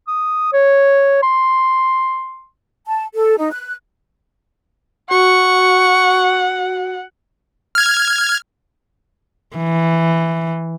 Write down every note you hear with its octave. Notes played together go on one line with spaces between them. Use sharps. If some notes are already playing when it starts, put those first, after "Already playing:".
D#6
C#5
C6
A5
A4
D#4
F#6
F#4 F#5 C#6
F6 G#6
E3